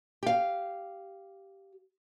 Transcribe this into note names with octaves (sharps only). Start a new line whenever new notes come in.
G4 F5